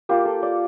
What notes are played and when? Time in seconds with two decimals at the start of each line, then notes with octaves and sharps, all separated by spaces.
0.09 A#3 F4 G4
0.25 A4
0.43 D5